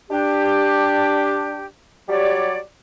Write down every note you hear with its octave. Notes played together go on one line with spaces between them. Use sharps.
D4 G4
F#3 G3 G4 C#5 D5